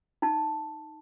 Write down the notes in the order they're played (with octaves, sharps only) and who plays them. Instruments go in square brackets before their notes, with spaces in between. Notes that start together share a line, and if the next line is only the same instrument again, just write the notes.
[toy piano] D#4 A5